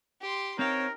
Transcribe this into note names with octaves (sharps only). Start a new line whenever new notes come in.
G4 C6
C4 D#4 A#4 C5 C#5 F5 G5